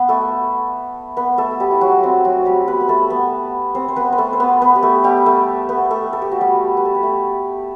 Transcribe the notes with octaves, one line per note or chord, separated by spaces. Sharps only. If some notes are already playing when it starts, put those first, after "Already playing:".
Already playing: B3 B4
A3 A4
B3 B4
A3 A4
G3 G4
E4
F#3 F#4
C4
F#3 F#4
G3 G4
B3 B4
B4
A3 A4
B3 B4
C4 C5
C5
B3 B4
B4
A3 A4
C5
B3 B4
B3 B4
G4
A3 A4
G3 G4
A3 A4
B3 B4
A3 A4
A4
G4
F#4
G3 G4
B4
A4
G4
A3 A4